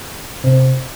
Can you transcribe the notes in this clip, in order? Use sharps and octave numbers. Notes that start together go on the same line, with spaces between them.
C3